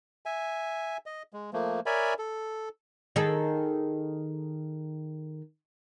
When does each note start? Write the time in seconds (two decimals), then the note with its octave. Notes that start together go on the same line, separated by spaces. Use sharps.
0.26 E5 G#5
1.06 D#5
1.33 G#3
1.53 F3 A3 A#3
1.86 A#4 C#5 D5 E5 G#5 B5
2.19 A4
3.16 D#3 G#4 A4